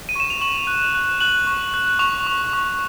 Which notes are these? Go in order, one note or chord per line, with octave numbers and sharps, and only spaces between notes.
D#7
C#6 E7
F7
C#6 F#7
F#6
F#6
F#6 F#7
C#6
F#6
C#6 F7
C#6
C#6